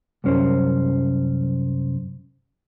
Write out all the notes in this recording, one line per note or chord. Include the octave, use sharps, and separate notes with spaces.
C2 F#2 C#4 C5